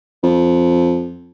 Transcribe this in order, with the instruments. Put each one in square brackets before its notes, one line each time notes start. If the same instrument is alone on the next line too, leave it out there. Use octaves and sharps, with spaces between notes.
[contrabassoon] F2